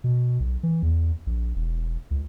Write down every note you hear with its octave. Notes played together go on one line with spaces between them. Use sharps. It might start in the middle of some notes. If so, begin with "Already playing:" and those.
B2
B1
E3
E2
A#1
E1
C#2